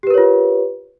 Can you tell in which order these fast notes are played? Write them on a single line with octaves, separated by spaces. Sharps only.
G4 B4 A#4 C#5 F4